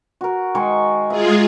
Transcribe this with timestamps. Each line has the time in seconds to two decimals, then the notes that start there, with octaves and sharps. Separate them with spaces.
0.21 F#4 A#4
0.55 D#3 G#3 C#6
1.10 G#3 F4 G#4 E5